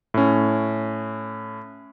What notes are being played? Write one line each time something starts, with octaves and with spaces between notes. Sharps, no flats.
A2 C#4